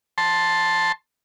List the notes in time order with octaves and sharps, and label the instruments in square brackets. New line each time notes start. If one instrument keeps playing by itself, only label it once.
[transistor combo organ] A5 C6